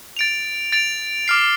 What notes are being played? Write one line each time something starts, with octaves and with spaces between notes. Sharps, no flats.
A6 D7 F7
A6 D7 F7
D6 F6 C7